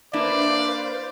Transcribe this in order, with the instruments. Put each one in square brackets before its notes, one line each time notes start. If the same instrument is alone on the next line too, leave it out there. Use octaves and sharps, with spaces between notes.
[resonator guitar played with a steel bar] A#3 D4 E4 [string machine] B4 C5 F5 [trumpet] D5